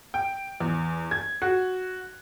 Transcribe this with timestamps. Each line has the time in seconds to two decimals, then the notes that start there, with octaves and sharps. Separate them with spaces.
0.14 G5
0.60 E2
1.11 G#6
1.42 F#4